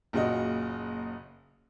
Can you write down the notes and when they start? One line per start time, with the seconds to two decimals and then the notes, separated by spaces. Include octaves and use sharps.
0.13 F#1 A#2 C#3 F#4 D#5